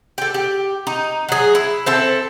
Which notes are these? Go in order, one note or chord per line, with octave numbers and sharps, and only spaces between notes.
G4 A4
G4
D#4
F#3 G#4
E4
C4 E4 A4